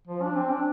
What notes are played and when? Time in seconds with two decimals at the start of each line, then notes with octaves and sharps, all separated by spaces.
0.07 F3
0.23 D4
0.37 C4
0.52 D4